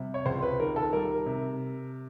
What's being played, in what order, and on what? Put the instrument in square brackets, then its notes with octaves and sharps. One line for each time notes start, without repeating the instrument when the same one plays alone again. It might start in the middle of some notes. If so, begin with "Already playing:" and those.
Already playing: [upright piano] C3 G3
C#5
C#2 C5
B4
D#3 A#4
A4
G3 A#4
C3